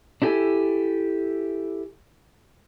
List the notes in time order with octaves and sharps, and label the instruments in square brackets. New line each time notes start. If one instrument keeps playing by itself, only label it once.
[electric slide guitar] D4 E4 G4 A4 G#5